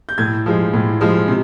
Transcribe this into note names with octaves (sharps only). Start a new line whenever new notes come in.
G6
A2 G#6
F3 G#3
A2
F3 G#3
C3